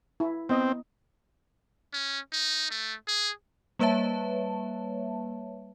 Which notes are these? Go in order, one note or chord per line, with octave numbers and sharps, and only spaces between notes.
E4
B3 C4 D#5
C#4
D#4
A3
G#4
G3 A#3 B4 C#5 E5 A5